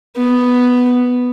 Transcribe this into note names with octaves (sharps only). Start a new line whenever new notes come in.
B3